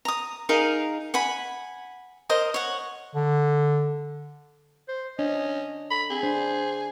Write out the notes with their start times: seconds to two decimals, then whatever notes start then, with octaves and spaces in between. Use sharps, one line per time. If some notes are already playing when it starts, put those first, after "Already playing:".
0.05 A#5 D#6
0.49 D#4 G#4 A#4 F5
1.14 F#5 G#5 B5
2.29 A#4 C5 D#5
2.54 C#5 F#5
3.15 D3
4.88 C5
5.19 C#4 D4 D#5
5.91 A4 B5
6.10 C4 G#4
6.23 D4 C5